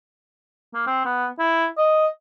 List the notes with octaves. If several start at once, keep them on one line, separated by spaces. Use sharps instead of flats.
A#3
C4
B3
E4
D#5